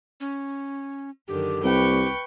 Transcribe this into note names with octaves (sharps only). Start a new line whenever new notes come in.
C#4
F#2 D3 D#3 G4
C2 B4 G5 C#6